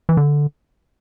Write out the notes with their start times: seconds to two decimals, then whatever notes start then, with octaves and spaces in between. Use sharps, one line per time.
0.09 E3
0.17 D3